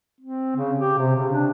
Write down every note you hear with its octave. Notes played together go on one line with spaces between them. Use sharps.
C4
C#3
G4
C3
C#3
D4